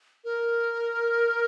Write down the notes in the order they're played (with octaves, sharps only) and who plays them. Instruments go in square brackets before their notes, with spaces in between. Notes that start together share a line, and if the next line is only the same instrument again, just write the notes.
[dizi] A#4